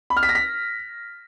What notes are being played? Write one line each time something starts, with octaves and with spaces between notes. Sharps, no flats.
B5
F6
B6
A#6
B6